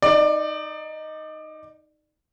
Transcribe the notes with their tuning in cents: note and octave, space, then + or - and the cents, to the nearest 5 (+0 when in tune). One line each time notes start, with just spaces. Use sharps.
D#4 +0 D5 +25